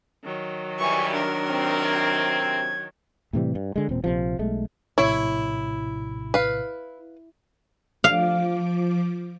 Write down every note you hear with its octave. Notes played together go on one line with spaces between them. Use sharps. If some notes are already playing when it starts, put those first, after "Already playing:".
D#3 F#3
E3 G3 G#5 C#6
D4 A#4
C3 C4
G#6
A2 C3 E3 G3
G2
D3 G#3
E1 A#2 C4
A#1 C3 F3
B1 G#3 A3
A#1 A2 C3 E4 C#5
B4 F5
F3 F5 D6